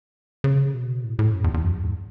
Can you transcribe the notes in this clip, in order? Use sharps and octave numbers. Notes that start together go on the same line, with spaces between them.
C#3
B2
A2
A2
F#2
E2
E2
F#2
E2
G#2